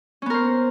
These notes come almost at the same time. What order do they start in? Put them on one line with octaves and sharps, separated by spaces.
C#4 B3 A#4 C5